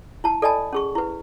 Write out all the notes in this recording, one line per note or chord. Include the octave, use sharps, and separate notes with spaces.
E4 A5
A4 D5 D#5 G#5 A5 B5
C#4 G#4 C#6
E4 B4